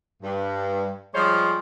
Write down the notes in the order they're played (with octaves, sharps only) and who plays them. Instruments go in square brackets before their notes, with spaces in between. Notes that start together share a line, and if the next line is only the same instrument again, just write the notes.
[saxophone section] G2
F3 G3 G#3 C5 C#5 D#5